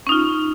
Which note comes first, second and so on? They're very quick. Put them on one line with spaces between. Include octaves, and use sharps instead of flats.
C#4 D#4 F4